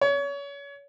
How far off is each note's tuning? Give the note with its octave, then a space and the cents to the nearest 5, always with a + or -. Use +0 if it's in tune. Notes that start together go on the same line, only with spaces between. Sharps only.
C#5 +30